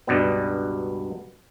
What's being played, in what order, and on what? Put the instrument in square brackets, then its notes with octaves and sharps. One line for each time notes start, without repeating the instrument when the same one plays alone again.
[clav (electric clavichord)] C#2 G2 B2 G3 B3